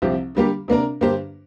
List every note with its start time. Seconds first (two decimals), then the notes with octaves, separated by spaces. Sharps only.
0.02 C2 C3 F3 C4 G4
0.35 D3 G3 A#3 G4
0.68 C3 A#3 D4 A#4
1.01 G2 D3 A#3 G4 C5